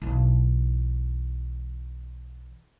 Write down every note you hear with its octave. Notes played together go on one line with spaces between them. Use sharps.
B1 E3